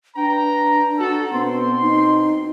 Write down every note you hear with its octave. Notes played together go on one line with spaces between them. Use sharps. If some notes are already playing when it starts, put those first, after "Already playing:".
D4 B4 G5 A#5
F#4 A4
B2 B3 C4 C6
D#4